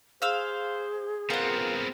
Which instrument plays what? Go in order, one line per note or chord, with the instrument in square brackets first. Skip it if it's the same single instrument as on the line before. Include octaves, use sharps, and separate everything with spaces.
[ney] G#4 [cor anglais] C5 [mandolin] F5 E6
[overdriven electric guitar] B3 C4 [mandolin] F4 F#5 [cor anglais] A#4